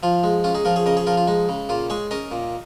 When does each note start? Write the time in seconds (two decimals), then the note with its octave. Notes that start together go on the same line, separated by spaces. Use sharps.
0.03 F3 F4
0.23 G#3
0.44 C#4 F4
0.55 D#4 G#4
0.65 F3 F4 A#4
0.76 G#4 C#5
0.86 C#3 A#4 D#5
0.97 G#4 C#5
1.07 F3 F4 A#4
1.17 F4
1.28 G#3 D#4
1.49 C#3
1.69 A#2 F4
1.90 G#3 G#4 C#5
2.11 C#4 A#4 D#5
2.31 A#2